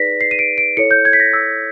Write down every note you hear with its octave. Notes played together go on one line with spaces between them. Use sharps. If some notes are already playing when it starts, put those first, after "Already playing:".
Already playing: D#4 G#4 B4 D5 A#6 B6
C7
D#7
D7
D7
E4 A4 C#5 C#7
G6
G#6
B6
A#6
E6